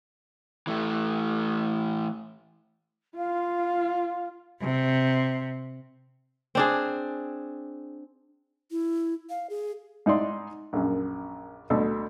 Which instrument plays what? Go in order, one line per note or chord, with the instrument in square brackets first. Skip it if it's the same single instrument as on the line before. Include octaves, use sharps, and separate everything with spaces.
[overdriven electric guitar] E3 A3
[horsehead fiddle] F4 [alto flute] F5
[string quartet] C3
[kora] C4 D4 G#4
[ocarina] E4
F5
G#4
[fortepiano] G#2 D#4 E4 D5 C6
A#1 F#2
D2 B2 A4